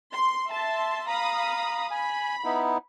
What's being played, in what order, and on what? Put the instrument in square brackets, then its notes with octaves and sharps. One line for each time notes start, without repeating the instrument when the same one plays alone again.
[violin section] C6
E5 A5 C6
[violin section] F5 B5 D#6 [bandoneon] A#5
[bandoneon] G#5 [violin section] B5
[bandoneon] B3 D#4 E4